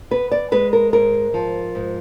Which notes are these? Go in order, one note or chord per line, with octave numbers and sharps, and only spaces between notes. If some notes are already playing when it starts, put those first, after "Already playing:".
B3 B4
D5
G#3 B4
A#4
G#2 A#4
F3
G#2